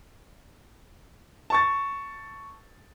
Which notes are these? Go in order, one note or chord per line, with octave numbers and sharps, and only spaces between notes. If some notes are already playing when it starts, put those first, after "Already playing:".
A5 C#6 A6